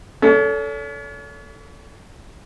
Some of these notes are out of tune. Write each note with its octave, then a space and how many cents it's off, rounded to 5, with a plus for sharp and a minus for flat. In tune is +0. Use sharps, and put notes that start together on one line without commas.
C#4 +45 A4 +0